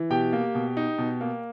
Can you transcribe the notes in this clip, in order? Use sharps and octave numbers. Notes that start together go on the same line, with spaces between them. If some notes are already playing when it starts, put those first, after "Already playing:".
Already playing: E3
B2 G4 G5
A#3
B2
D#4
B2
A#3